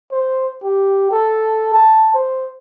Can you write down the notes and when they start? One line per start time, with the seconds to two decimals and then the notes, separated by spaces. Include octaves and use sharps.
0.12 C5
0.63 G4
1.12 A4
1.74 A5
2.14 C5